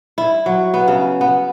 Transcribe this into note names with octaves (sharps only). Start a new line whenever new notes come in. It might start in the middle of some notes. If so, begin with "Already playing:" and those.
E4
F#3
B3
C#3
B3